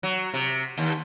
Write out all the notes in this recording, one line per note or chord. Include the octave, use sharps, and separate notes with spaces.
F#3
C3
D#2